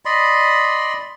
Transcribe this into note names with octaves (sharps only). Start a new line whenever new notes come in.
D5 D#5 B5 C6